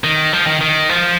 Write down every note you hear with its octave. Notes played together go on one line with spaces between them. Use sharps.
D#3
F3
D#3
D#3
F3